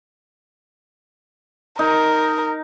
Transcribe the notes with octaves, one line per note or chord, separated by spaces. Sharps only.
D#4 A#4